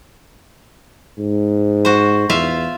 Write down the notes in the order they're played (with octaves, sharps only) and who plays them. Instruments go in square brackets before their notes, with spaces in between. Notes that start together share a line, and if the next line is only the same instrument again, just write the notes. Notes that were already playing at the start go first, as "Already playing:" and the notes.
[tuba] G#2
[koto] F#4 C5
[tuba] E2 [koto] F4 E5 F5